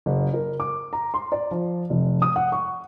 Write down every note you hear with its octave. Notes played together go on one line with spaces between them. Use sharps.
F#1
A#4
D6
A#5
C6
D5
F3
F1
D#6
F#5
C#6